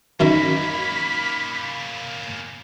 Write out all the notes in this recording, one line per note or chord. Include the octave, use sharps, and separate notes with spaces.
F#2 D#3 A#3 C#4 D#4 E5 B5